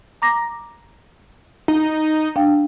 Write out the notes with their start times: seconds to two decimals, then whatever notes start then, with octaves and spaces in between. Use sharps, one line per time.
0.22 A#5 D6 A#6
1.68 D#4
2.36 D4 F5 G5